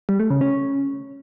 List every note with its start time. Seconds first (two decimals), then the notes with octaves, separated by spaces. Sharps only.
0.09 G3
0.20 A3
0.30 C#3
0.41 C#4